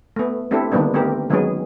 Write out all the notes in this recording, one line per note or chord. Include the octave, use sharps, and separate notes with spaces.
A3 B3
A3 C4 D4 E4 G4 A4
D3 D#3 G3 A#3 B3 D4
A3 B3 C4 G4 A#4
D#3 F#3 G#3 B3 C#4 G#4